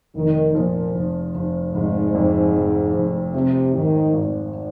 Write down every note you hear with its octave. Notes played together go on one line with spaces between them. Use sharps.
F1 D#3
A#2 F3
F1
F1
F1 G#2
F2
F1
F1
C3 F3
G#2 D#3
G#1